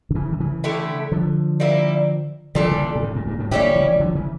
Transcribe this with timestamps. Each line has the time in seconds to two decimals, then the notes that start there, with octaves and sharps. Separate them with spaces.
0.11 D3
0.15 C#3 E3
0.33 D3
0.40 C#3 E3
0.64 D3 A3 E4 G4
1.12 D3 F3
1.60 G3 A#3 E4
2.55 A#2 D3 F3 G3 D4 A4
2.72 C#3 E3
2.95 A#2
3.03 A2 C#3
3.15 G2 A#2
3.27 G2 A#2
3.39 A2 C#3
3.51 A#2 D3 G3 C#4 E4 G4
3.75 C#3 E3
3.90 E3
4.00 D3 F3
4.15 C#3 E3